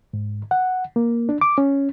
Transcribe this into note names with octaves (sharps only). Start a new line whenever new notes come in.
G#2
F#5
A#3
D4
D6
C#4